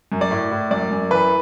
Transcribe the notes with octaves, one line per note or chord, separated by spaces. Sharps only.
F#2
D5
A2
A2
F#2 D5
F#2
E3 B4